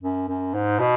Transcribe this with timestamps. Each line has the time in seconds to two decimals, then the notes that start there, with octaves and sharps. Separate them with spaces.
0.03 F#2
0.29 F#2
0.54 G#2
0.79 B2